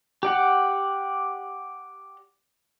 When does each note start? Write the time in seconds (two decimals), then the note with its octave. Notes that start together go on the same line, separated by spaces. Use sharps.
0.23 G4 D5 F#5